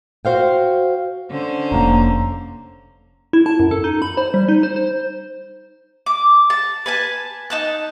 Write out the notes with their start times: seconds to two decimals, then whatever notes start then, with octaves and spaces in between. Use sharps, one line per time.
0.25 F#4 C5 F5 G5
1.30 D3 C#4 C5
1.72 F1 G#2 A#3 A#5
3.33 E4
3.46 A5
3.60 F#2
3.71 A4
3.84 D#4
4.02 B5
4.17 C5
4.34 G3
4.48 D#4
4.63 C5
4.76 C5
6.06 D6
6.50 A5
6.86 B4 G#5 A5
7.50 D#4 A5 F#6